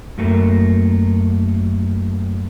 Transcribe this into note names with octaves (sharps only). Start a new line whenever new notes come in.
F#2 A3 A#3